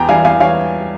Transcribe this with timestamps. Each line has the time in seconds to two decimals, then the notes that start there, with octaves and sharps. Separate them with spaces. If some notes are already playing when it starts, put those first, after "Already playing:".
Already playing: E2 G5 A#5
0.09 E3 G3 F5 G#5
0.25 E2 F5 G#5
0.40 E3 C#5 F5